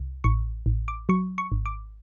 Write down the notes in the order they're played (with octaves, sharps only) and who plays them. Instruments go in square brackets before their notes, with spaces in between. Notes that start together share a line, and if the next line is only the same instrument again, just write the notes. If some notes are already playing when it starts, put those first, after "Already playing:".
Already playing: [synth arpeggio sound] C2
A1 C#6
A1
D6
F#3 C#6
C#6
G#1
D6